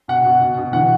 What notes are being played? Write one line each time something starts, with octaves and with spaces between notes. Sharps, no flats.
B2 F#5
B2
B2
B2
E3 F#5